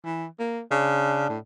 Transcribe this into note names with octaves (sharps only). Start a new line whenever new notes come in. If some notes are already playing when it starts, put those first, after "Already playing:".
E3
A#3
C#3 D4
A2